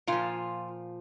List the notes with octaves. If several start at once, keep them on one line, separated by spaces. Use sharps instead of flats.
A#2 F3 F4